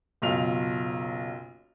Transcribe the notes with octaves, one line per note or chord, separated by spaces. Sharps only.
F#1 B1 F4 F7